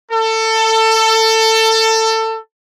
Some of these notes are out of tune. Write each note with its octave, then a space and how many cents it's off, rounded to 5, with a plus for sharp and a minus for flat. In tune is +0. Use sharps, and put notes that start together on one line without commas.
A4 +20